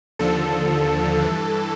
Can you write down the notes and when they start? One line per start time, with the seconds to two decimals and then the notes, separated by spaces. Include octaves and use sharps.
0.19 D#2 D3 F3 A4
1.22 G2 E3